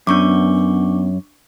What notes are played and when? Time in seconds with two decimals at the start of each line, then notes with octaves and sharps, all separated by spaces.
0.07 F#2 B3 D4 C#6 D6